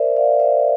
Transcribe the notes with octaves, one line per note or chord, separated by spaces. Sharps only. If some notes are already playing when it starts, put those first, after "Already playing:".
Already playing: A#4 C5 D5 E5
D5 F5
C5 E5